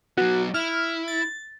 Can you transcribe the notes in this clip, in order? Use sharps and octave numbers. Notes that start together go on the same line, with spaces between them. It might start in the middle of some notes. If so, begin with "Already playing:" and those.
F#3 B3 F#4
E4 F6
A6